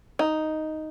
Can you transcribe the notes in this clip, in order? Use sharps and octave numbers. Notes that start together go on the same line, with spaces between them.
D#4